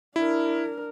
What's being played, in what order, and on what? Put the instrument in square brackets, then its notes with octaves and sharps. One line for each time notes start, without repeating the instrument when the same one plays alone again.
[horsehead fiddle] D4 A#4 [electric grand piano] E4